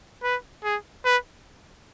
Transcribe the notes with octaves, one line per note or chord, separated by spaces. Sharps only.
B4
G#4
B4